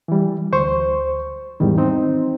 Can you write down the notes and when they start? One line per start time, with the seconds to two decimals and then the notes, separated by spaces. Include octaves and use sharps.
0.08 E3 G3
0.53 D2 C5 C#6
1.60 E2 G#2 D#3 G3
1.78 C4 D#4